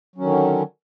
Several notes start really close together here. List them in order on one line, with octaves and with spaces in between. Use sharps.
F#3 C#4 D#3 D3